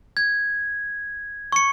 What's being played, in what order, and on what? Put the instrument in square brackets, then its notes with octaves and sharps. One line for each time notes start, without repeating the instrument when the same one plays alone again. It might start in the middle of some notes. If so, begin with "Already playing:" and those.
[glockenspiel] G#6
C#6 C#7